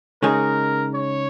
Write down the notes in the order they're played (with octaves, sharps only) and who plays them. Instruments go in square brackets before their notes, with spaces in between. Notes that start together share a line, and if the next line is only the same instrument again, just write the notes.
[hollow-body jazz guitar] C#3 G#3 D#4 G#4 [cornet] A#4
[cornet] C#5